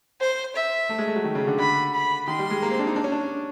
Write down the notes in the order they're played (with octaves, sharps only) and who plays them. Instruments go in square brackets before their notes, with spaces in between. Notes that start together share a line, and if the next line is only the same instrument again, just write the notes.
[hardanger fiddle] C5
E5
[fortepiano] A3
G#3
A3
F#3
D#3
C#3
D3
[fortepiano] D3 [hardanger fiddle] B5
[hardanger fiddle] B5
[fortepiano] D#3 [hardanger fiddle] C6
[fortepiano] G3
G#3
A#3
C4
D4
D#4
D4
C#4
D4